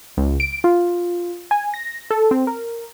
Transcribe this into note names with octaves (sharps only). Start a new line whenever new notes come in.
C#2
D7
F4
G#5
A#6
A4
C4
A#4